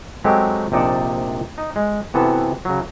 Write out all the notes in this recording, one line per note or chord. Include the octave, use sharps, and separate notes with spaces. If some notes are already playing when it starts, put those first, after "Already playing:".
F#3 G#3 A3 C4 G4
A#1 C3 D#4 D5 F#5 A5
D#4
G#3
C3 E3 B3 F#4 A4
C#3 F#3